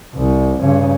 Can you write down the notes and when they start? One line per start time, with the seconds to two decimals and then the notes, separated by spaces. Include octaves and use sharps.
0.15 C2
0.59 G2 C#3